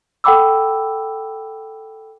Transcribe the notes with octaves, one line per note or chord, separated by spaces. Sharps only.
A4 F#5 G5 B5 D6 E6